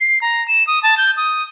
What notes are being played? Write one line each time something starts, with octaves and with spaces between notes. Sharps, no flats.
C7
A#5
E7
D#6
A5
G6
D#6